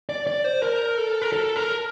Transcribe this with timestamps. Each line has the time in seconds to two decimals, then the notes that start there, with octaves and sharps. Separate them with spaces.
0.09 D5
0.27 D5
0.44 C5
0.62 A#4
0.97 A4
1.22 A#4
1.32 A4
1.56 A#4